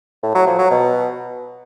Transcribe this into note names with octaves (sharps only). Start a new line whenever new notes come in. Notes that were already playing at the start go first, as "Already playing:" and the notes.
A2
F#3
F3
F#3
B2